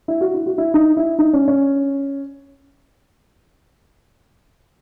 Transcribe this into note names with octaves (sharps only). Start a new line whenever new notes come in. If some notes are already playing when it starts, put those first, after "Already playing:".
E4
F#4
E4
F#4
E4
D#4
E4
D#4
C#4
C#4